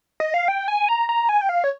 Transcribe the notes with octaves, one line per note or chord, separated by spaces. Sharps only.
D#5
F5
G5
G#5
A#5
A#5
G#5
G5
F5
C#5